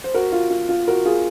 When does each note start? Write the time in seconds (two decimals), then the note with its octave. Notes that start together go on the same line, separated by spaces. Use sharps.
0.04 C5
0.14 F#4 A#4
0.32 F4
0.50 F4
0.69 F4
0.88 F#4 A#4
1.05 F4 G#4